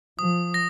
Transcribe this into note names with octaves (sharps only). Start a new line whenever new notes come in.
F3 D#6
A#6